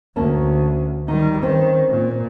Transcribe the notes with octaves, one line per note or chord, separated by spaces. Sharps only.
D2 A#3 C#4 A5
D#3 G3 D#4
D#3 C4 C#4 C5
A#2